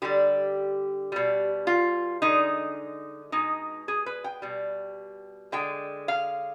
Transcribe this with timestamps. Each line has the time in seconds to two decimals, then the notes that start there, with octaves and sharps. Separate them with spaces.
0.02 D3 G3 G4
1.12 B2 G3
1.67 F4
2.22 D3 G#3 D#4
3.32 B2 G#3 D#4
3.88 G#4
4.06 B4
4.24 G5
4.42 B2 G3
5.52 D3 G#3 G5
6.08 F5